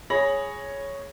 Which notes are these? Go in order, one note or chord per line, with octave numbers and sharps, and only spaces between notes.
G#4 C#5 B5 A#6 F#7